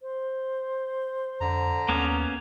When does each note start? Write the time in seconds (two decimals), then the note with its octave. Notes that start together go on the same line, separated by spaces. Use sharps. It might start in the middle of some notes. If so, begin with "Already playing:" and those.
0.02 C5
1.41 F2 D3 A#5
1.89 D#2 A#3 B3 C#4